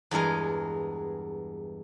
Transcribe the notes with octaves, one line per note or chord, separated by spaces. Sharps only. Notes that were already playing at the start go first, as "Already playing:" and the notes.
E2 G2 G#3 A#4 G#5